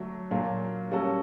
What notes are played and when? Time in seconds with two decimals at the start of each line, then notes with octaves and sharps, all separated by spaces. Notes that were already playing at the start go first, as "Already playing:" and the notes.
Already playing: D3 F#3 A3 D4 F#4
0.31 A#2 F#3 A#3 D4
0.91 G3 A#3 C#4 F#4 A4